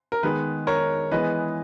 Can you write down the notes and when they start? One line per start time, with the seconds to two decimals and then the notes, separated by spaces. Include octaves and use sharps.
0.12 A#4
0.23 D#3 G#3 B3 B4
0.67 A#4 C#5
1.11 E3 G#3 B3 B4 D#5